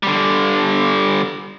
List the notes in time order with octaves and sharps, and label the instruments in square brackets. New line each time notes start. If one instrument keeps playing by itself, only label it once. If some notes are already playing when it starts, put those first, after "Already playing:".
[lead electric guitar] D3 G3